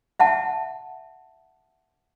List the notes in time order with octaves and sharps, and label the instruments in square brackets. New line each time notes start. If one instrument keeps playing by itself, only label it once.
[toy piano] E5 F#5 A5